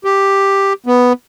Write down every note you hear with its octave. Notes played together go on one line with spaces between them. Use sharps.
G4
B3